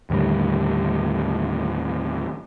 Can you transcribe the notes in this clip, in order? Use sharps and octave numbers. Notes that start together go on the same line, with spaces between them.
D#2 A2 D3 G3